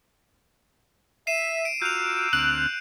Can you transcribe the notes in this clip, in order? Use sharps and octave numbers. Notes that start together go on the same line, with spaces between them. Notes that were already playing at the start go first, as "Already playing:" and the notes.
E5 C7 D#7 E7
D7
F4 F#4 A#5 D6 E6 G6 F7
D2 C4 F6 F#6 D7